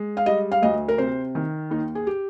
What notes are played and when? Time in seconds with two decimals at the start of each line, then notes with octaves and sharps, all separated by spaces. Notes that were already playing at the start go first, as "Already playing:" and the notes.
Already playing: G#3
0.17 F5
0.26 G3 D#5
0.52 F5
0.62 D2 D#5
0.88 A#4
0.98 C3 C5
1.35 D#3
1.70 D#2 D#4
1.95 G#4
2.07 G4